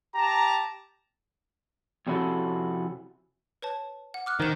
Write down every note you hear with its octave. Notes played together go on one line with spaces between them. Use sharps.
G4 A5 A#5
F2 C3 C#4 E4 F#4 A4
B4 C#5 A5
F#5
D6 F6 F#6
D#3 C5 E7